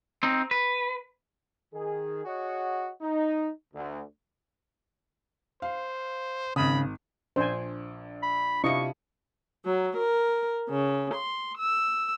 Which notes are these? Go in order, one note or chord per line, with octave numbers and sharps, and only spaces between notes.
C4 D#4
B4
D#3 G#4
F#4 G#4 C#5 D#5 F#5
D#4
D2
C5 F5
G#1 C#3 B5 D#6
A#1 D4 C5 G#5
B5
C3 D4 E4 F4 D#5 C#6 C#7
F#3
A#4
C#3
C6
E6